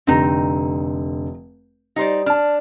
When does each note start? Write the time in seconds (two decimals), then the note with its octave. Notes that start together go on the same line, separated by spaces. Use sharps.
0.07 F1 D3 C4 D#4 A#5
1.96 G3 D#4 C5 D5
2.26 D4 A5 F6